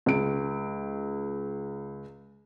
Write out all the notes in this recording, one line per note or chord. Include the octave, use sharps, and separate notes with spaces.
C#2 D7